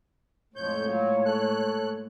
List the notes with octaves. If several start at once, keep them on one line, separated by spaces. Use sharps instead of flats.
F2 A2 G#3 A#3 C#5 G6
F#3 F4
A4 F#6